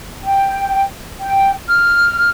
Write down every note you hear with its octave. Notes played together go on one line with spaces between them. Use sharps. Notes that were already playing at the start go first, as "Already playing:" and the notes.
G5
G5
F6